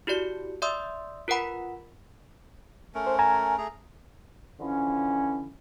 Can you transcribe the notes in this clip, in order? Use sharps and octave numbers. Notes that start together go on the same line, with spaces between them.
E4 F#4 G4 D5 C#7
D5 E5 C6 D#6 E6
F4 A#4 B4 F#5 B5
A3 C#4 A#4
C5
G#5 A#5
A3 G#4 A#5
D3 E3 F3 C#4